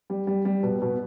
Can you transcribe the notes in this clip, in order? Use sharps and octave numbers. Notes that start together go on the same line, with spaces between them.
G3
G3
G3
B2
B2